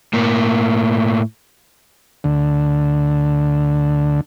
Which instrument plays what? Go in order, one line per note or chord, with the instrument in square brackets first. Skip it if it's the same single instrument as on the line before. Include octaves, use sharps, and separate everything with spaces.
[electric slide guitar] A2 A#3
[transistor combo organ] D2 D3